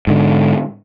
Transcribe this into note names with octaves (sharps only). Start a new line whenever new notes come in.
G#2 D3